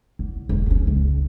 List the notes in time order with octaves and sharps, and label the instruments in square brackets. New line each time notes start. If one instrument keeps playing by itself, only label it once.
[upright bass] E2
E1 F#2
F3 C#4
C#2